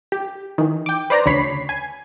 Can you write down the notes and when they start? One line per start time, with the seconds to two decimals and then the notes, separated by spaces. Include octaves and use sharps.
0.12 G4
0.58 D#3 E3
0.86 G5 D6
1.10 B4 C5 D5 A#5
1.26 D2 C#3 C#5 B5 B6 C7
1.69 G#5